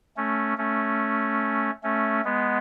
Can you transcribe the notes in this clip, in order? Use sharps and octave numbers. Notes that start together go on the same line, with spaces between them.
A3 C#4
A3 C#4
A3 C#4
G#3 B3